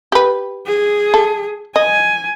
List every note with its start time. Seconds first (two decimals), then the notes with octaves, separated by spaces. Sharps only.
0.12 G4 B4
0.67 G#4
1.14 A4
1.76 D#5 G#5